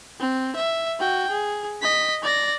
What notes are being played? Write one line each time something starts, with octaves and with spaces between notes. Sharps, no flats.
C4
E5
F#4 G5
G#4
D#5 B6
D5 A#6